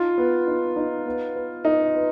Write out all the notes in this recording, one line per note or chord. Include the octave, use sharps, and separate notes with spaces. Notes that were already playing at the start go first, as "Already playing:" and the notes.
Already playing: D#4 F4
B3
D#4
D#4
B3
B4
D#4 D#5
B4